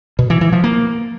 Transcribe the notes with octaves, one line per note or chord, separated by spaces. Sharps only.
B2
E3
E3
F3
A#3